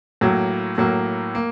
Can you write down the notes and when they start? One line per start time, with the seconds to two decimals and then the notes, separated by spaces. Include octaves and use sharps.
0.21 A2 F#3 A#3
0.78 A2 F#3 A#3
1.35 A#3